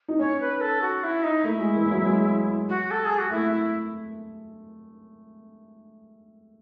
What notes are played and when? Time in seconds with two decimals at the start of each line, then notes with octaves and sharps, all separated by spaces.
0.08 D#4
0.19 C#4 C#5
0.40 B4
0.60 A4
0.81 F#4
1.03 E4
1.23 D#4
1.44 A3 E4
1.59 G#3
1.75 E3
1.86 E3
1.90 F#3
2.01 F#3
2.06 G#3
2.69 F#4
2.90 A4
3.05 G#4
3.18 F#4
3.31 A3 E4
3.51 E4